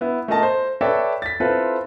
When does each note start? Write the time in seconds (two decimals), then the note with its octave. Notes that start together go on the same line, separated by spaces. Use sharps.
0.01 B3 E4
0.28 A3 F4 A#4 D#5 A5
0.43 C5
0.81 A4 B4 C#5 D5 E5 G5
1.22 A6 B6
1.40 C4 E4 F4 A4 B4